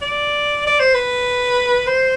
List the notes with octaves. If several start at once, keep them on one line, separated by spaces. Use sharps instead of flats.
D5
D5
C5
B4
C5